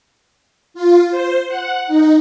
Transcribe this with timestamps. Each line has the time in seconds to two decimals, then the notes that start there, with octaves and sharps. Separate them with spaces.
0.74 F4
1.10 C5
1.48 F#5
1.87 D#4